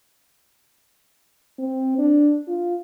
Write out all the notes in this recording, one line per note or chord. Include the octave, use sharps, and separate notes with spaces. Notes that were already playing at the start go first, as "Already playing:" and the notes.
C4
D4
F4